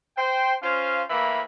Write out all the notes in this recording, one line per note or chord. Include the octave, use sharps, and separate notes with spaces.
C5 G5
C#4 F4 C5 F5
A2 E3 A#3 E5 B5